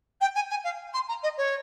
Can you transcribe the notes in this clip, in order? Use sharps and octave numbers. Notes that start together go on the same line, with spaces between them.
G5
G#5
G#5
F5
C6
A#5
D#5
C#5